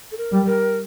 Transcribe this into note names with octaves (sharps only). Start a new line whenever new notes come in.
A4
A#4
G3
A#4